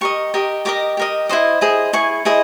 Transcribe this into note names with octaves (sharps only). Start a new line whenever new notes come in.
G4 A#4 D#5 C#6
G4 A#4 D#5
G4 A#4 D#5 D6
G4 A#4 D#5
E4 G#4 C5 D#5
E4 G#4 C5 D#5
E4 G#4 C#6
E4 G#4 C5 D#5